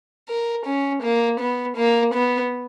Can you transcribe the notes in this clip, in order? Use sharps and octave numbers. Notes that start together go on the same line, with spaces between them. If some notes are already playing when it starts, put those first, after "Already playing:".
A#4
C#4
A#3
B3
A#3
B3